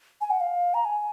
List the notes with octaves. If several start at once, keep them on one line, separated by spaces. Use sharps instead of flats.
G#5
F#5
F5
A#5
G#5